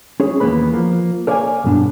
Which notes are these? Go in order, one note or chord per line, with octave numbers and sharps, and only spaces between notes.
C#4 G#4 C#5
D#2 E3 A#3 B3 B4 B5
F3 A#3
A#4 C#5 D5 F5 F#5 G#5
B1 G2 B3 D4